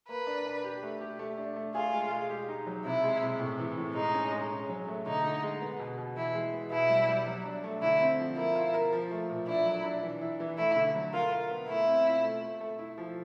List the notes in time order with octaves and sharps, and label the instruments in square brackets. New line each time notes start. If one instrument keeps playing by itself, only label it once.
[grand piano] A#3 [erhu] B4
[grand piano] D4
D4
G4
A3
G4
A3
D4
A3
[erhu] F4 [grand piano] G#4
[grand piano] G#3
G#3
G4
D#4
F#3
[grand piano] C3 [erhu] E4
[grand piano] G#3
C3
A2
E3
A2
[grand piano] G#3 [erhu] D#4
[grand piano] C#4
G#3
C#4
F#3
A3
[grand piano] D3 [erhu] D#4
[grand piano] D3
G#3
B3
B2
B2
[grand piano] E3 [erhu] E4
[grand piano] G#3
B3
[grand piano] B2 [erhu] E4
[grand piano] G3
G3
F#3
D4
A3
[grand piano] D3 [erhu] E4
[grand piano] C4
F3
[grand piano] A#3 [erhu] E4
[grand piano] F4
A#4
F3
A3
A#2
[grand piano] D4 [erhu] E4
[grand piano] F#3
D4
E3
E4
E3
[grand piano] A3 [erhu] E4
[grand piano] D3
F#3
[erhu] F4 [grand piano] A#4
[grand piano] A#4
B3
[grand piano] A3 [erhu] E4
[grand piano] C4
F4
A3
A3
A3
E4
F3